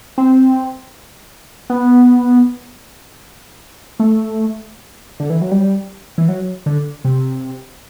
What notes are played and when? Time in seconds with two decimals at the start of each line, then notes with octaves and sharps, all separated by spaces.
0.18 C4
1.70 B3
4.00 A3
5.20 D3
5.30 E3
5.41 F#3
5.51 G3
6.18 E3
6.29 F#3
6.66 D3
7.05 C3